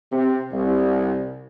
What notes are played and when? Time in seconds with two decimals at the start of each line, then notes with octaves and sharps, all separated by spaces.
0.11 C3
0.52 C2